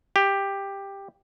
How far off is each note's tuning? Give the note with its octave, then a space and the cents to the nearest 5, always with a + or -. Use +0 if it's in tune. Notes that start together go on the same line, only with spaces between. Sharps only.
G4 +10